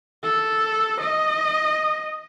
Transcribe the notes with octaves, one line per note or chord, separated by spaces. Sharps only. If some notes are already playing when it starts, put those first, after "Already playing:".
A4
D#5